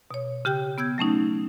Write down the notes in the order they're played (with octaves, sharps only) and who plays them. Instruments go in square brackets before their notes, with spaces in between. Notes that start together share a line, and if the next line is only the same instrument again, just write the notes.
[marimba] B2 C#5
C#3 G4 G5 F#6
B3 E6 G6 G#6
F#3 A3 C#4 D#4